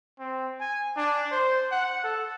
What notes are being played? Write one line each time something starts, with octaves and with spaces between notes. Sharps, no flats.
C4
G#5
D4
C5
F#5
A4